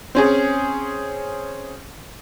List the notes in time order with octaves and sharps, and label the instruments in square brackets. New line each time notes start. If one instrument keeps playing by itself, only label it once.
[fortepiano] C4 C#4 G#4